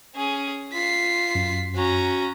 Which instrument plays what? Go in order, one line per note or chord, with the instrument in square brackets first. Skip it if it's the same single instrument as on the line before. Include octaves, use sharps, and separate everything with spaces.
[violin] C#4 G#4
[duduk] F4 [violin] B6 C7
[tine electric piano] F#2
[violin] C#4 A#5 [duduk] F#4